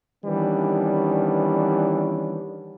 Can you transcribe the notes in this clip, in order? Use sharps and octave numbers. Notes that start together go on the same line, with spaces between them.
D#3 E3 G3 B3 C#4 D4